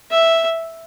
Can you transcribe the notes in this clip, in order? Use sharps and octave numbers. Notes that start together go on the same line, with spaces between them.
E5